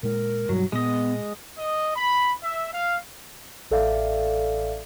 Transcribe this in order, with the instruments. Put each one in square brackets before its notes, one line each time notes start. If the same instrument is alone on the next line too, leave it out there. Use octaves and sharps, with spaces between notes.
[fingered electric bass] A#2 G#3 [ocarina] A#4
[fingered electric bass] G2 B2 G3 [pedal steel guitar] F#3
[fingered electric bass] A#2 [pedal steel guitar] G#3 D#5 [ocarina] B3
[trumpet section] D#5
B5
E5
F5
[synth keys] A1 A4 D5 E5 F5